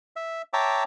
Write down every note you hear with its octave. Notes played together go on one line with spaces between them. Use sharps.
E5
C#5 E5 G5 A5 A#5 D6